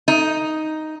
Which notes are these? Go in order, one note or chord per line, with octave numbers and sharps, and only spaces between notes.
D#4